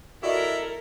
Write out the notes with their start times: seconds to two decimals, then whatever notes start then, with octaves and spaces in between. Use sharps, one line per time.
0.23 E4 F#4 A4 A#4 D5 D#5